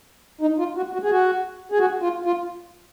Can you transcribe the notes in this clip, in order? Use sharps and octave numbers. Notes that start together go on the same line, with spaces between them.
D#4
F4
F#4
F#4
G#4
F#4
G#4
F#4
F4
F4